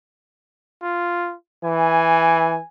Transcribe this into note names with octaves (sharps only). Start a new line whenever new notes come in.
F4
E3 G#5